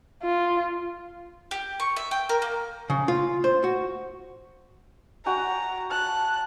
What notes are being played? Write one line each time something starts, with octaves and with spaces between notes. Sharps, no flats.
F4
G4
C#6
E5
G5
A#4
A#3
C#3
F4
C5
F#4
F#4 G5 G#5 A#5
A5 F#6